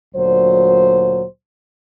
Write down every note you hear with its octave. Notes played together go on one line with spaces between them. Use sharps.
D2 A#2 F#3 C5